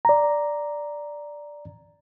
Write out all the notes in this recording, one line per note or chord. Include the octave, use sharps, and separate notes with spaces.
D5 A#5